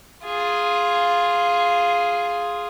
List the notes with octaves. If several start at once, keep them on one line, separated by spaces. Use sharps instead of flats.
F4 G#4